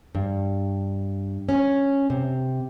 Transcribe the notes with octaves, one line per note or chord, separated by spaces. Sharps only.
G2
C#4
C3